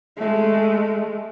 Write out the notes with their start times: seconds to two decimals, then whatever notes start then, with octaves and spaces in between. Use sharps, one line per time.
0.17 G#3 A3